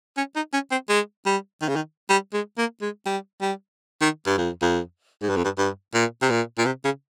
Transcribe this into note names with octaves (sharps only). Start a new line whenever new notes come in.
C#4
D#4
C#4
C4
G#3
G3
D#3
C#3
D#3
G3
G#3
A#3
G#3
G3
G3
D#3
G2
F2
F2
G#2
G2
F2
G2
G2
A#2
C3
A#2
A#2
C3
C#3